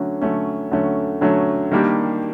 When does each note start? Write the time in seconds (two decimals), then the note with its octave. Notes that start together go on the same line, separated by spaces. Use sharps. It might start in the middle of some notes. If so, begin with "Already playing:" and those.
Already playing: D3 F#3 A3 C#4
0.21 D3 F#3 A3 C#4
0.71 D3 F#3 A3 C#4
1.21 D3 F#3 A3 C#4
1.71 D#3 G3 A#3 D4 G4